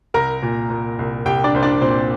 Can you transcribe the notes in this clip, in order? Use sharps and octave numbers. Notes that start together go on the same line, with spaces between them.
C2 A#4 A#5
A#2
A#2
C2
C2 G4 G5
D4 D5
C2 C5
D4 D5
A#2 C4 C5